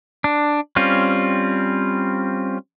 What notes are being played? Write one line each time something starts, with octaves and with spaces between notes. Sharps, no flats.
D4
G3 C4 C#4 F4